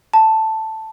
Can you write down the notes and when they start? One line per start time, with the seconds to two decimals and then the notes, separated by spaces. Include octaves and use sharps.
0.13 A5